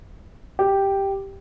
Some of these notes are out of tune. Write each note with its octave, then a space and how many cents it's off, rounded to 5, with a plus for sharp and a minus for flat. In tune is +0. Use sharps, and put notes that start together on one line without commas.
G4 +0